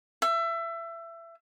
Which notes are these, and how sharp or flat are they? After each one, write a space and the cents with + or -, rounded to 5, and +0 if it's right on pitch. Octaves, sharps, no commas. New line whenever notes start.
E5 +25